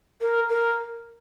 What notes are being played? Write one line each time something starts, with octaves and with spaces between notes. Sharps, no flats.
A#4
A#4